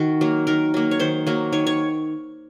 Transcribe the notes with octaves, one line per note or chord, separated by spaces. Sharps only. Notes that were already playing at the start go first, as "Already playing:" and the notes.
Already playing: D#3 F#4
F#3 A#3
D#3 A#4
F#3 A#3
C#5
D#3 C5
F#3 A#3
D#3 C#5
C#5